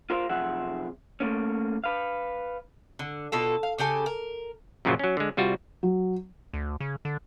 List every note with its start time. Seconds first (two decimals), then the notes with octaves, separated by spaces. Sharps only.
0.10 F4 A#4 C5 E5 F5
0.29 B1 C3 F3 G#4 E5 F#5
1.20 A3 A#3 C#4
1.84 B4 F5
2.99 D3
3.32 B2 F4 A4
3.63 F5
3.78 C#3 G4 A4 G#5
4.06 A#4
4.85 F#2 A#2 C#3 F3 F#3 F4
4.99 F#3 C#4
5.17 D3 G#3
5.37 C2 G3 F4 F#4
5.83 F#3
6.53 D2
6.80 C#3
7.05 D3